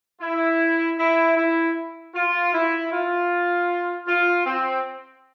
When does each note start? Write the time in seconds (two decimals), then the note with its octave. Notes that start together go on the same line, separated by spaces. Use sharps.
0.21 E4
0.98 E4
1.36 E4
2.14 F4
2.53 E4
2.92 F4
4.07 F4
4.46 C4